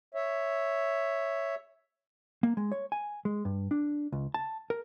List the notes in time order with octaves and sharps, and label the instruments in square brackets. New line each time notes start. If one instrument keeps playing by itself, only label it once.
[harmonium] C#5 E5
[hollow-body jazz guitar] A#3
G#3
C#5
G#5
G#3
G2
D4
C#2
A5
A#4